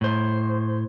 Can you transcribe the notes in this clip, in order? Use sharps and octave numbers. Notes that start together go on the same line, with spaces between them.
A2 C5